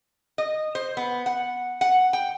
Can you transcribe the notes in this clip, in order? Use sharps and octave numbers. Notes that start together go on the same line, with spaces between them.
D#5
C5
B3
F#5
F#5
G5